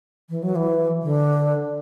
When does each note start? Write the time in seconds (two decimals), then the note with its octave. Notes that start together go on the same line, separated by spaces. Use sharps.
0.30 E3
0.43 F#3
0.56 E3
1.02 D3